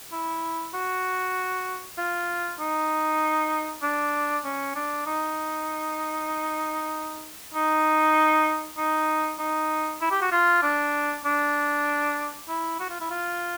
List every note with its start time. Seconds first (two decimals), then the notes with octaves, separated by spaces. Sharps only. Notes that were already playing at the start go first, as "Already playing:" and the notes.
0.12 E4
0.74 F#4
1.98 F4
2.60 D#4
3.82 D4
4.45 C#4
4.76 D4
5.07 D#4
7.54 D#4
8.78 D#4
9.39 D#4
10.01 E4
10.11 G4
10.22 F#4
10.32 F4
10.63 D4
11.25 D4
12.48 E4
12.80 F#4
12.90 F4
13.00 E4
13.11 F4